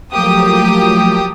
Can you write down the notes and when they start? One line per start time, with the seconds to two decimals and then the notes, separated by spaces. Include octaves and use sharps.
0.11 F3 F#3 A3 A#3 G4 D#6